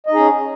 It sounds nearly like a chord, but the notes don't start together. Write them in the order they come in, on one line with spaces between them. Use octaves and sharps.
D#5 D#4 G#4 C#4